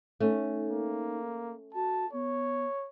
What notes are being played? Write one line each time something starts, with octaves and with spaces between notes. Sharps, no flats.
A3 C#4 D#4
A#3
F#4 A5
B3 C#5